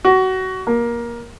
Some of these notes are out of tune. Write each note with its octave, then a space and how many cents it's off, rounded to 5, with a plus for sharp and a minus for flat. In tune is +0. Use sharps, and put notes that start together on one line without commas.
F#4 +20
A#3 +20